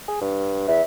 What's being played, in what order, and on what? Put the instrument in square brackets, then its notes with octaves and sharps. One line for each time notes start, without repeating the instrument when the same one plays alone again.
[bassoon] G#4
G2
[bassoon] E2 [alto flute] E5